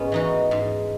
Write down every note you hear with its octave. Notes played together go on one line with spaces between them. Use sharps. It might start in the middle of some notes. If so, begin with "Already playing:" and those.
Already playing: G#2 B3 C#4
E3 D#4 F#4
G#2